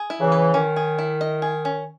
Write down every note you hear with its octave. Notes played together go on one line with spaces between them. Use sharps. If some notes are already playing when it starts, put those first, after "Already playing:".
Already playing: G#4
E4
C#3 E3
B4
D#3 C#4
G#4
E4
D#5
G#4
C#4